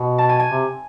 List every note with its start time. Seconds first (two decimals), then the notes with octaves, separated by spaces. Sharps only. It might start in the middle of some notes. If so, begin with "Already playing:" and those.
Already playing: B2
0.18 A5
0.29 G#5
0.40 G#5
0.50 C3